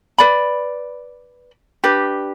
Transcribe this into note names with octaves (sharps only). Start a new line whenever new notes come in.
B4 D5 B5
D4 G4 B4